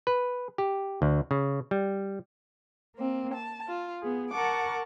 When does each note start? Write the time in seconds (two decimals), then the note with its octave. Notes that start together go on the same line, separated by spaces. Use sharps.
0.07 B4
0.58 G4
1.02 D2
1.31 C#3
1.71 G3
2.95 A#3 C4
3.33 A5
3.68 F4
4.01 B3 G#4
4.31 A#4 F#5 A5 C#6 D6